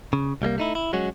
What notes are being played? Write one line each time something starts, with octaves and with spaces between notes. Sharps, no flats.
C#3
C2 G3 G#3 A#3
A3 D#4 E4
E4
F#3 G#3 C#4 F#4